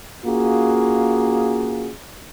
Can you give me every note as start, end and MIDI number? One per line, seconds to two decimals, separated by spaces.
0.25 1.90 58
0.25 1.90 61
0.25 1.90 65
0.25 1.90 66
0.25 1.90 68